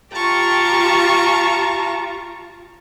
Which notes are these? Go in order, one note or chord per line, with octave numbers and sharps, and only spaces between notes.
F4 G4 A5 A#5 C#6